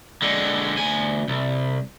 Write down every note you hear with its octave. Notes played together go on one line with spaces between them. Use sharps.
D3 G#3
D2 G#5
C2